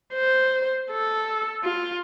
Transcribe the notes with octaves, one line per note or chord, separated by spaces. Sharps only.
C5
A4
F4